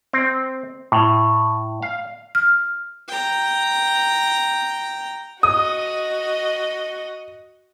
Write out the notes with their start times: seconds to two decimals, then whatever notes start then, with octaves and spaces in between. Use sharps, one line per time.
0.13 C4
0.92 A2
1.82 F5
2.35 F6
3.08 G5 A#5
5.43 F#4 D#5 D#6